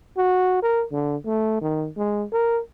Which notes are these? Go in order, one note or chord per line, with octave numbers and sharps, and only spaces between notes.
F#4
A#4
D3
A3
D#3
G#3
A#4